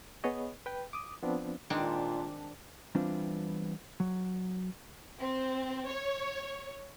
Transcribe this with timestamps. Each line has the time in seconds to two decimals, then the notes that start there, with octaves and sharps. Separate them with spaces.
0.24 B3 G#4 B4 C#5 D#5
0.66 B4 G5
0.93 D6 D#6
1.23 F3 B3 C4 D4
1.70 A#2 D#3 G#3 C4 D4
2.95 E3 G3 B3 C4 D4 F4
4.00 F#3
5.21 C4
5.89 C#5